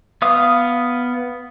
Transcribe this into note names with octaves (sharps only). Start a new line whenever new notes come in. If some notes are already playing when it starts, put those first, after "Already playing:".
B3 F5 D#6